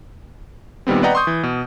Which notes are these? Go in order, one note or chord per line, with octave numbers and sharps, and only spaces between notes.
A#2 D#3 G3 B3 C4
B4 D5 D#5 F#5 G5 A#5
C6 C#6 D#6 G6
E3
B2